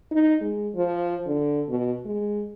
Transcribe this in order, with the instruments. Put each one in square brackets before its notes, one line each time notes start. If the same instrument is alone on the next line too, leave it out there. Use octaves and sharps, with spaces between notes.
[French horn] D#4
G#3
F3
D3
B2
G#3